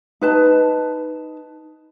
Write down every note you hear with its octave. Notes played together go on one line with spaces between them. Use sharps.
D#4 B4 A5